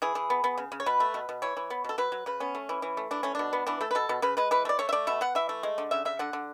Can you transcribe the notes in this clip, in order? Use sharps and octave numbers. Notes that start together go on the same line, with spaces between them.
E3 G#4
E3
B3
B3
C#3
C#3
C#5
B2 B4
A3
B2
B2
E3 C#5
E3
B3
B2 A4
F#3 B4
F#3
C#3 B4
B3 C#4
A3
E3
E3
A3
E3 D4
A3 C#4
B2 D4
B3
E3 D4
A3 A4
B4
B2 A4
B2
C#3 B4
G#3 B4
E3 B4
A3
D5
A3 C#5
E5
A3 D5
B2 E5
B3 F#5
E3 E5
A3
G#3
D3
C#3 E5
C#3 E5
D3 F#5
D3